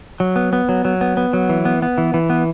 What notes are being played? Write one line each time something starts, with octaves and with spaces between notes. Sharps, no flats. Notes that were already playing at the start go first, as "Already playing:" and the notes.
F#3
B3
B3
F#3
F#3
B3
B3
F#3
E3
B3
B3
E3
E3
B3